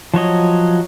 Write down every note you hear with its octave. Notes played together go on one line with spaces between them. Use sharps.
F3 F#3 C#5 D#5